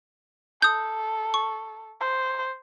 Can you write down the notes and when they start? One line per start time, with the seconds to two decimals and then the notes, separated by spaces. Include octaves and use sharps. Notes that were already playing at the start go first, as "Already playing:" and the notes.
0.62 A4 D#6 G6
1.34 C#6
2.01 C5